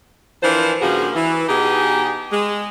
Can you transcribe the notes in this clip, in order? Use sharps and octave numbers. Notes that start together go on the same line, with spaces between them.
E3 F3 D4 A#4 C5
G2 C#3 F3 A#3 F#4 G#4
E3
B2 D#4 G4 G#4
G#3